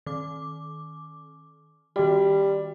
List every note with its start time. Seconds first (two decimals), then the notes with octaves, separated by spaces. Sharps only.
0.06 D#3 D6
1.96 D#3 G3 F#4